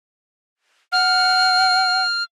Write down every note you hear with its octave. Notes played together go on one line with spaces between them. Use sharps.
F#5 F6